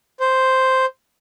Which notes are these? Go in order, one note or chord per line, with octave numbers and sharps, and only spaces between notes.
C5